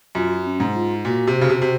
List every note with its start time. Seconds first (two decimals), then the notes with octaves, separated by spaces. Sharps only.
0.15 F#2 F4
0.46 C#4
0.60 G#2
0.75 F4
1.05 A#2 F#4
1.27 C3
1.41 C#3
1.49 C3
1.62 C3